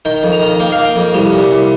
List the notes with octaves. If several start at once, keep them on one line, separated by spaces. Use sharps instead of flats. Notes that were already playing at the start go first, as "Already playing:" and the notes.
D#3 G5
F2
A#5
D#3
A#3 G5
F5
A#3
G5
F2
C2 G4
A#2
C2